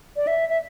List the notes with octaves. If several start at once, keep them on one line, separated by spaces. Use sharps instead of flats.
D5
E5
E5